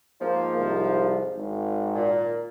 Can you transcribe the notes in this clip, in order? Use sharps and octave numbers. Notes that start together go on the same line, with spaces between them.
G#2 F3 A#3
C2
G#1
A#2